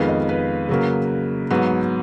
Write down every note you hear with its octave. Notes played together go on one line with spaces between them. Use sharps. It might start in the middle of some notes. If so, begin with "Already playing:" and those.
Already playing: F2 D#3 G#3 B3 F5
D#5
B4
C#3 F#3 A#3
G#2 F#3 B3